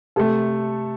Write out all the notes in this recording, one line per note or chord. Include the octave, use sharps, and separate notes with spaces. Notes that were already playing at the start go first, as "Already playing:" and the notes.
C3 A3 A4